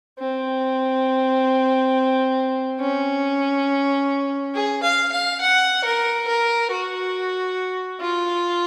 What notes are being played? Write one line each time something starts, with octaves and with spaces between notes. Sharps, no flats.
C4
C#4
G#4
F5
F5
F#5
A#4
A#4
F#4
F4